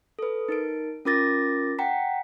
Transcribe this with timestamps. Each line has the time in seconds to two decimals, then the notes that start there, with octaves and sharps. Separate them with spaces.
0.19 A4 B4
0.49 D#4 A#4 D7
1.05 C#4 F4 A#4 D6 A6 A#6
1.79 F#5 G5 A#5 B6